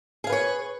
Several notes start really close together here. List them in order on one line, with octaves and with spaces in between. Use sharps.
G#4 F5 B4 C#5